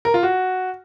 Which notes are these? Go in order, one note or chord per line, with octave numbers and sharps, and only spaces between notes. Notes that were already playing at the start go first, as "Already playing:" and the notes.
A#4
F4
F#4